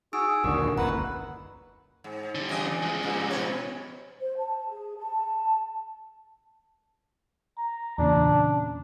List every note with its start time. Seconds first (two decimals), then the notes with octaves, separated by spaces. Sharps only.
0.13 D#4 F#4 G#4 E6 D7
0.27 G#4
0.44 A#1 D#2 D3 F#4 A#4
0.78 F#1 C#2 B4 D#5 F#5 A#5
2.04 G#2
2.35 D3 G3
2.49 E2 C#4 D#5
2.83 F3 G#3
3.03 G2 A#2
3.30 B2 B4 C#5
4.20 C5
4.37 A5
4.69 G#4
4.97 A5
7.58 A#5
7.98 E2 A#2 C#3 D4